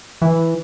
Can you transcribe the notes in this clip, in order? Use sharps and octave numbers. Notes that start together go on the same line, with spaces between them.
E3